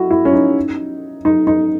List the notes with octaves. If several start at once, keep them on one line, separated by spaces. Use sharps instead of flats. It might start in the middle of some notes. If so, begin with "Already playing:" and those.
Already playing: E4 F#4
E4
C#4
D#4
D#4
D#4